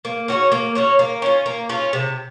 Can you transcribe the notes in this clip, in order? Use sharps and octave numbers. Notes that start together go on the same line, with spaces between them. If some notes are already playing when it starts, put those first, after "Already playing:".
A#3
C#4 F#4 C#5
A#3
C#4 F#4 C#5
A#3
C#4 F4
A#3
C#4 F4
C3